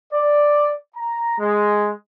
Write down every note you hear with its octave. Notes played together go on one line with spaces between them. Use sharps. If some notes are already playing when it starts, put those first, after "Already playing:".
D5
A#5
G#3